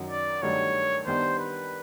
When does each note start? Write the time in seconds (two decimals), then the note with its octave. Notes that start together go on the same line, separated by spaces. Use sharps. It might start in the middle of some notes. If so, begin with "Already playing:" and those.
Already playing: F#2 D#3 F#3
0.10 D5
0.42 G2 D#3 F#3 A3 D4 C#5
1.06 D#3 G3 B3 D4 C5
1.39 B4